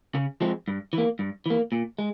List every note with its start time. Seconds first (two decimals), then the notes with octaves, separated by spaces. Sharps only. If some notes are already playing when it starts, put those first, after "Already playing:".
0.15 C#3
0.41 F3 G#3 C4
0.68 G2
0.93 E3 A#3
1.19 G2
1.46 E3 A#3
1.72 A#2
1.99 G#3